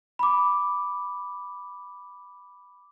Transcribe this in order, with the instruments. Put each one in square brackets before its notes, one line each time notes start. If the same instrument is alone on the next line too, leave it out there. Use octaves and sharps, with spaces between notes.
[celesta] B5 D6